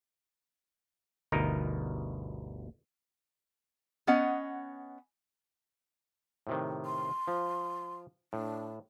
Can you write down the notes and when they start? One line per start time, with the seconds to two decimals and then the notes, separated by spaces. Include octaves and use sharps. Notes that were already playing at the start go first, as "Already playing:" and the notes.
1.32 G1 D2 B2 D#4 A#4
4.07 B3 C#4 D#5 F#5
6.47 A2 C3 D#3
6.85 C6
7.28 F3
8.33 A2 D4